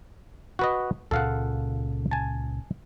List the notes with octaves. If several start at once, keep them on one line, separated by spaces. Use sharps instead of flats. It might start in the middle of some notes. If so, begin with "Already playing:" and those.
F#4 B4 D#5
C#2 A#2 C#3 A4 F5 F#5
G#5 A5